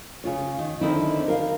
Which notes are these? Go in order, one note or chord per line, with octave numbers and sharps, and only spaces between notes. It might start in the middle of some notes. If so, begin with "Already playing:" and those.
C#3 F4 C#5
D#3
D3 D#3 C4 D#4 E4
A#4 F5